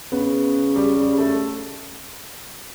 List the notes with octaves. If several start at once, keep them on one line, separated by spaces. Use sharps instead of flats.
C#3 B3
G3
G3
A3